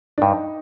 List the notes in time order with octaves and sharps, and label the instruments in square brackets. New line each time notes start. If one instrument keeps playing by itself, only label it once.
[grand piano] D4
[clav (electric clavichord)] G2 [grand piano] D#4